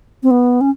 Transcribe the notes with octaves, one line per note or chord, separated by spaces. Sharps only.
C4
B3
C#4